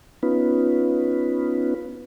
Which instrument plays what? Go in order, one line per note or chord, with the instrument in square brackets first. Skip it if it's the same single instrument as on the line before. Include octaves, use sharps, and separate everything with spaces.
[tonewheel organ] B3 C#4 D#4 F4 B4